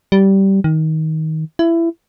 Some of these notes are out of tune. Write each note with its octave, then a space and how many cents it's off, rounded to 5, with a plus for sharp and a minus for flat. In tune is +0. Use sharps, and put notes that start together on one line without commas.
G3 -15
D#3 +20
E4 +20